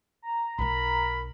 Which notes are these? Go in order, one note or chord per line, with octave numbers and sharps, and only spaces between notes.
A#5
B1 D#4 A#4 B5